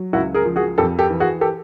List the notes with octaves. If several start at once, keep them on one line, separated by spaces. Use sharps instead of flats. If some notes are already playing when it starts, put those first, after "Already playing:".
Already playing: F#3
C#2 E4 F#4
G#4 A#4
F3
F#4 G#4
F2 G4 A4
G4 A4
E3
F#4 G#4
G4 A4